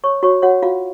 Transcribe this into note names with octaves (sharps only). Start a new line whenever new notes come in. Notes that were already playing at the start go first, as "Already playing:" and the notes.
C#5 C#6
F#4 C#5 C#6
F#4 C#5 F#5
F4 F#4 F5